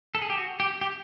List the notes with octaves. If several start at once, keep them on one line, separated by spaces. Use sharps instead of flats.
A4
G#4
G4
F#4
G4
G4